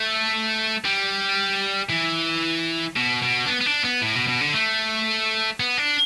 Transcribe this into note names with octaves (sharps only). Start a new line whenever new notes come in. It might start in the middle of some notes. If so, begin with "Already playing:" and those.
Already playing: A3
G3
E3
B2
B2
D4
B3
B3
D4
B3
A2
B2
B2
D3
A3
B3
D4